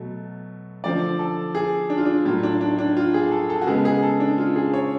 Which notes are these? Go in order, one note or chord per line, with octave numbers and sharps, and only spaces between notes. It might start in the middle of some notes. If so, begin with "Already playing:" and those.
Already playing: B2 F#3 A3
D3 F3 A3 D5
A4
G#4
D4
F4
D4
A2 F#3 A3 F4
D4
D4
D4
F4
G#4
A4
A4
F#4
C#3 G#3 B3 G#4
G#4
A4
D4
F4
G#4
C#5